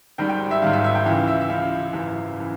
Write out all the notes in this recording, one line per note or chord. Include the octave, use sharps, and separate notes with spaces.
G#1 G#2 D#3 G3 G5
G5
E5
G#1 G#2 D#3 G3 F5
E5
E5
G5
C#2 C#3 E3 F5
E5
E5
C#2 C#3 E3 F5
G#1 F#2 C#3 E3
C#3 E3